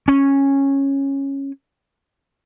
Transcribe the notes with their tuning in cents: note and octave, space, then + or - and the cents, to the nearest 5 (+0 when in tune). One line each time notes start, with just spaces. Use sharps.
C#4 -10